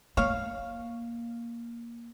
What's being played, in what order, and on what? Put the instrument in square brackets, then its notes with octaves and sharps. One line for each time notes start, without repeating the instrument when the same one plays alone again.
[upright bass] A#3 [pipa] C#5 F5